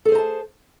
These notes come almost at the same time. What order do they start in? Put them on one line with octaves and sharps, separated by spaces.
A4 G#4 C5 A#5 A5